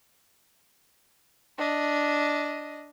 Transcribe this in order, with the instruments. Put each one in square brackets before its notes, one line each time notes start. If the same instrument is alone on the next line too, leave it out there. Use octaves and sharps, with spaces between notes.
[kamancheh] D4 D#5